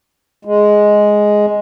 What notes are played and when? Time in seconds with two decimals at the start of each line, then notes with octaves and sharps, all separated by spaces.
0.45 G#3